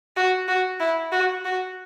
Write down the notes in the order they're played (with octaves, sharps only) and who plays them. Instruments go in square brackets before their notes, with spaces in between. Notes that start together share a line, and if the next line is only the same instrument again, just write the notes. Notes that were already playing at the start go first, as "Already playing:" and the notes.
[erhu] F#4
F#4
E4
F#4
F#4